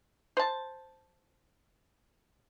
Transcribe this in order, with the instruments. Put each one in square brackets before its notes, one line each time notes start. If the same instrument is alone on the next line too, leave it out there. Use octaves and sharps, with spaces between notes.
[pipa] C5 A5